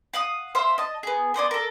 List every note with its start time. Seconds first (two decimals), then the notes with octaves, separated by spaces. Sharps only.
0.14 F5 F#5 D#6
0.55 C5 E5 F5
0.78 D#5 A5
1.03 B3 G#4
1.34 B3 C5 D5 G#5
1.51 A4 A#4